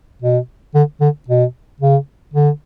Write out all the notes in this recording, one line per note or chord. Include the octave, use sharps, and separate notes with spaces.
B2
D3
D3
B2
C#3
D3